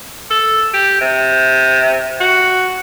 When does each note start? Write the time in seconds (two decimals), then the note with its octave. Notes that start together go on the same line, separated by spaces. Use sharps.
0.31 A4
0.73 G4
1.01 C3
2.20 F#4